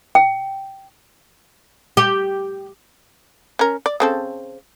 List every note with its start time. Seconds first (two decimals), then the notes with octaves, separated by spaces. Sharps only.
0.15 G5
1.97 G4
3.59 C#4 A#4
3.86 D5
4.00 C#3 C4 A4